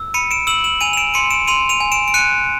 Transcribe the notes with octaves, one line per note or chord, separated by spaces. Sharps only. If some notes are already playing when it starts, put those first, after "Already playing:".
Already playing: E6
B5 C#7 D#7
D7 E7
E6 E7 F#7
E7 F#7
G#5 D#7 F7
F7
D7 E7
C6 C#7 D#7
D7 E7
C6 D#7 F7
D#7 F7
G#5
D7 E7
D7
F#6 C#7 D#7